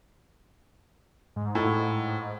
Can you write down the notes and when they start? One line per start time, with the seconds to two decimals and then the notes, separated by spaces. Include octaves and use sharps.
1.36 G#2
1.55 A2